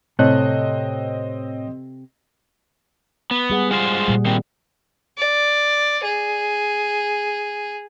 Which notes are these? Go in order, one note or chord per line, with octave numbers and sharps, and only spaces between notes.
A2 C3 C4 A4 C#5 D#5 F#6
B3
G3 G#4 F#5
G#3 F4 C5
A#2 G3
D#3 C4
D5
G#4